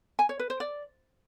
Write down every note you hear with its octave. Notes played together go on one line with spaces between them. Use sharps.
G#5
C#5
B4
C5
D5